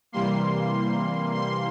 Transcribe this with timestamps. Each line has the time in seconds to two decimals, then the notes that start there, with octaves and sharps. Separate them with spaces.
0.12 C3 E3 G3 A#3 C6
1.35 C6